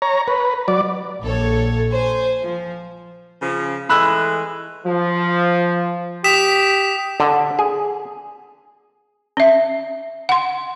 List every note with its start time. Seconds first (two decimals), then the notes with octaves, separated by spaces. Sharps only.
0.02 C#5 A#5
0.28 B4
0.68 F#3 D5
1.22 A#1 A4 C#5
1.92 C5 G#5
2.41 F3
3.41 C#3 F3
3.89 E3 G#3 A3 B5 E6 F#6
4.86 F3
6.24 G4 D#6 B6 E7
7.20 D3
7.59 G#4
9.37 C#4 E5
10.29 F#5 C6